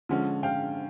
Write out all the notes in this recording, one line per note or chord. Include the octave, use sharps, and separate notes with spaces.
D3 F3 G#3 C#4
F5 G5